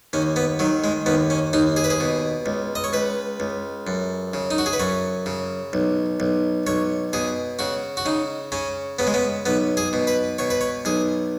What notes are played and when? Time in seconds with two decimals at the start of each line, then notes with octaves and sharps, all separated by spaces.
0.13 D#2 C#4
0.36 B3
0.59 D#3 F#3
0.84 G#3
1.06 D#2 B3
1.30 C#4
1.53 D#2 D#4
1.77 G#4
1.84 B4
1.90 G#4
2.00 B2
2.46 C#2
2.75 D#5
2.84 C#5
2.93 C#2 B4
3.40 C#2
3.87 F#2
4.34 C#3
4.51 D#4
4.58 F#4
4.66 G#4
4.73 B4
4.79 F#2 C#5
5.26 C#3
5.73 B1
6.20 B1
6.67 B1 C#5
7.13 B2 G#4
7.59 C#3 F#4
7.97 F#4
8.05 C#3 D#4
8.52 C#3 C#4
8.99 C#3 B3
9.07 G#3
9.14 B3
9.46 B1 B3
9.77 G#4
9.93 B2
10.07 B4
10.38 B2 C#5
10.50 B4
10.61 C#5
10.85 B1 G#4